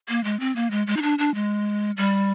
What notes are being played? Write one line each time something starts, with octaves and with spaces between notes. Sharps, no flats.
A#3
G#3
C4
A#3
G#3
G#3
D#4
D4
D4
G#3
G3